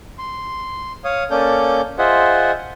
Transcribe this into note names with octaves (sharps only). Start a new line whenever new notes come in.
C6
C#5 F5 D#6
A#3 C#4 A4 D5 G6
F4 G#4 C5 D#5 E5 F#5